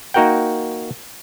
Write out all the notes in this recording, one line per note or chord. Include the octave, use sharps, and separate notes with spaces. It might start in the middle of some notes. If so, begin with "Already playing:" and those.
A#3 D#4 F#4 A#4 F#5 G5